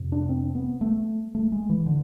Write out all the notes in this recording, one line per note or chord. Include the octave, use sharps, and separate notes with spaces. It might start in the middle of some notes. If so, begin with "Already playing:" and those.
Already playing: F2 C3
D4
C4
B3
A3
A3
G#3
E3
D3